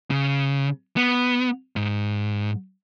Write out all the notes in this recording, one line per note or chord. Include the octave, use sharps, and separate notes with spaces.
C#3
B3
G#2